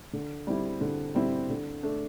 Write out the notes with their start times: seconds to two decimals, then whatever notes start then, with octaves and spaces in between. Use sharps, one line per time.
0.13 D3
0.47 G3 C4 E4
0.81 D3
1.15 G3 C4 E4
1.50 D3
1.83 A3 D4